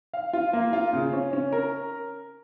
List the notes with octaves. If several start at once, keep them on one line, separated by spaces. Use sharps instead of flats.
F5
F4
A#3
F4
C#3
C#4
C#4
A#4